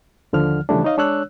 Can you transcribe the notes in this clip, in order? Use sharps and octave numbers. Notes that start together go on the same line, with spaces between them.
D#2 D3 F3 F6
C#3 E3 F3 G3 A3 D4
D#4 C#5 D#5 F5
G#3 D4 C#5 E6 F#6